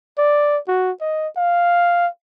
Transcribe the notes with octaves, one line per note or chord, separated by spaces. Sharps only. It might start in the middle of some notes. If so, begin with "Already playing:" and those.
D5
F#4
D#5
F5